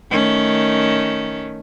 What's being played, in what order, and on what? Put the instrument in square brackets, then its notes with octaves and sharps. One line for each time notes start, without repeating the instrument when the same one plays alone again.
[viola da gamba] D#3 A3 C#4